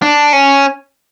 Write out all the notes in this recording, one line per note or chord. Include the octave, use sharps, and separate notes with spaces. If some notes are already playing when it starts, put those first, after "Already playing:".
D4
C#4